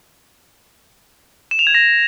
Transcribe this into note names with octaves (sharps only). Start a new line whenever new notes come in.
E7
F7
G#6
A#6